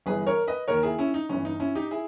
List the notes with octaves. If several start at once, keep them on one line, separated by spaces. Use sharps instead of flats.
G1 G2 E3 G#4 B4
A#4 C#5
B4 D#5
D#2 D#3 A#4 C#5
E4 G#4
C#4 E4
D#4
G1 G2 E3 C#4
D#4
C#4 E4
D#4 G4
E4 G#4